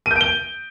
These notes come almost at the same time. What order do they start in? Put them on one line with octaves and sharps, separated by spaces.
D#7 G6 D7 G7